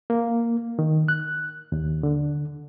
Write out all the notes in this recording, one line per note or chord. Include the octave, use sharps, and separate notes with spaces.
A#3
D#3
F#6
D#2
D3